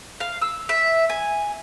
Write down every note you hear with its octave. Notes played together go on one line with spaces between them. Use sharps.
F5
E6
E5
G#5